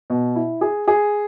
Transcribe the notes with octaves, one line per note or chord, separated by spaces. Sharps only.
B2
E4
G#4
G#4